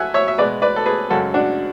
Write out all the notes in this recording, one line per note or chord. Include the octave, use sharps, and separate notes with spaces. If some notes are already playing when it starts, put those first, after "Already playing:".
Already playing: F#3 A3 E5 F#5 G#5
C#5 E5
E5
B2 G#3 B4 D5
B4 D5
A4
G#4 B4
F#2 C#3 G#3 F#4 A4
D4 F#4